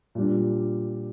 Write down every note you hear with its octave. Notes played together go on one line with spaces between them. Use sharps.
A#2 G3 D4